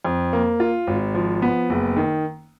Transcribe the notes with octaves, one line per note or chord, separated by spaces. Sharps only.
F2
A#3
F4
G#1
F3
B3
F#1
D#3